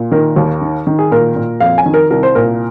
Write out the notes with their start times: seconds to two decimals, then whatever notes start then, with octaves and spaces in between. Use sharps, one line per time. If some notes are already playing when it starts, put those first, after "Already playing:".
Already playing: A#2
0.11 D#3 A#4
0.36 D#2
0.61 D#3
0.87 D#3
0.99 G#4
1.11 A#2 A#4
1.36 A#2
1.60 F2 F5
1.78 G#5
1.86 D#3
1.94 A#4
2.10 C2 A#4
2.23 C5
2.35 A#2 A#4